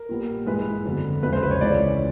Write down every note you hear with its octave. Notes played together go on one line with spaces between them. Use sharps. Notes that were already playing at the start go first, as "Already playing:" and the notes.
Already playing: A#4
A#2 G3 B3
G2 E3 G#3 B4
F2 D3 F#3 B3
E2 C#3 F3 G#3 B3 B4
C5
B4
C#5
C#2 C#3 E3 D5